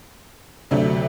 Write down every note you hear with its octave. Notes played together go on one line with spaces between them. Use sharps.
D2 C3 F#3 A3 D4